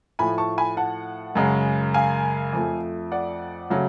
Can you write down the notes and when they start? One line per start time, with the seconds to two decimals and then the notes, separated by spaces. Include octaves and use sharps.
0.19 A2 F3 A3 G#5 B5
0.38 A5 C#6
0.58 G#5 B5
0.77 F#5 A5
1.35 F#2 C#3 G#3
1.94 F5 G#5
2.53 F2 F3 A3
3.12 D5 F#5
3.70 C#3 F#3 A3